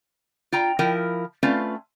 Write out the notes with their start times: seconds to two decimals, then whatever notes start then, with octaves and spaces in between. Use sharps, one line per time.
0.52 F4 G5 A#5
0.79 F3 E4 A#4 G5
1.43 A3 C4 C#4 F4 B4 F5